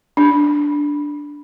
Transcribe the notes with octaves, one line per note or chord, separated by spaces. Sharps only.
D4